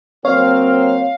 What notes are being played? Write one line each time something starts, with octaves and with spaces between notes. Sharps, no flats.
F#3 A#3 C4 C#5 F5